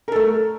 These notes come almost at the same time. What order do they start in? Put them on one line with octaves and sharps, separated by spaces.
A#4 A4 A3